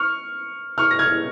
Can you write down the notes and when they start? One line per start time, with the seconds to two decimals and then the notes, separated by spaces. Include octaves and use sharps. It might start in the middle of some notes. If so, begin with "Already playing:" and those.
Already playing: C#6 F6
0.78 C#6 F6
0.91 A#6
0.99 F6 G#6